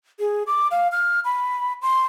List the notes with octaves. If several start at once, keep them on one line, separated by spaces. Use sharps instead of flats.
G#4
D6
F5
F6
B5
C6